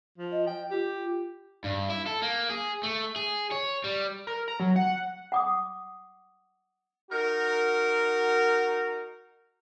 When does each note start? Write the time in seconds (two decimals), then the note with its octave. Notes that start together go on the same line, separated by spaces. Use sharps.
0.18 F3
0.32 D#5
0.47 G5
0.71 F4 G4
1.64 G2
1.90 E4
2.06 A4
2.22 A#3
2.49 G#4
2.83 A3
3.16 G#4
3.51 C#5
3.84 G3
4.27 A#4
4.48 A#5
4.60 F#3
4.76 F#5
5.32 F#5 D6 D#6
7.11 D#4 F#4 A#4